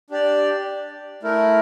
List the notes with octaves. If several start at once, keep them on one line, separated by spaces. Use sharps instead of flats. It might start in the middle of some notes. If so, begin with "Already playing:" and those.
D4 G4 D5
A3 E4 A#4